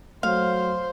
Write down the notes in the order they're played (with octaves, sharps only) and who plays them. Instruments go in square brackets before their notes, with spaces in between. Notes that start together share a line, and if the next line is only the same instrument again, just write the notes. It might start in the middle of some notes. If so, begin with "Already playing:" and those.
[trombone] F#3 [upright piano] A3 [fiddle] C5 [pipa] F5